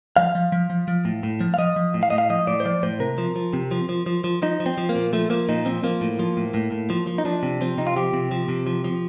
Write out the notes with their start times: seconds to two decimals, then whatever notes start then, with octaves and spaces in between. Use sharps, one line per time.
0.17 F3 F5
0.35 F3
0.52 F3
0.70 F3
0.88 F3
1.05 A2
1.23 A2
1.40 F3
1.54 F5
1.58 F3 D#5
1.76 F3
1.94 A2
2.03 F5
2.10 A2 D#5
2.18 F5
2.30 F3 D#5
2.47 A2 D5
2.60 C5
2.65 F3 D5
2.83 A2 C5
3.00 C3 A#4
3.18 F3
3.36 F3
3.53 C3
3.71 F3
3.89 F3
4.06 F3
4.24 F3
4.42 F3 D#4
4.60 F3
4.66 C4
4.78 F3
4.89 A#3
4.95 A#2
5.13 F3 A3
5.30 F3 A#3
5.49 A#2 D#4
5.65 F3 C4
5.84 F3 A#3
6.01 A2
6.19 F3
6.37 A2
6.54 A2
6.72 A2
6.90 F3
7.07 F3
7.18 D#4
7.25 F3 D4
7.43 C3
7.61 F3 C4
7.78 C3 D#4
7.87 F4
7.97 F3 G4
8.13 C3
8.31 F3
8.49 C3
8.67 F3
8.84 F3